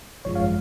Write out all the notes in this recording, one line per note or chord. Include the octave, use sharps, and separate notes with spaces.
G#1 F#2 F3 G#3 C#5
F5